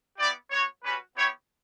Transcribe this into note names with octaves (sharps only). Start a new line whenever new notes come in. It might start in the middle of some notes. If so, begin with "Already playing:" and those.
B3 E4 G4 D5
B3 F#4 C#5
G3 C#4 F#4 B4
B3 E4 G4 C#5